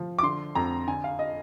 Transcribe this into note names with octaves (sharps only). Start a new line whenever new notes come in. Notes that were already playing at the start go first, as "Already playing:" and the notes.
Already playing: F3
D6
D3 C6
F2 A#5
D3 G#5
F5
D#5